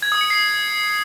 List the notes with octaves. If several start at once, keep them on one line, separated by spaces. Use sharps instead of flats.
G#6
D#6
C#7
C7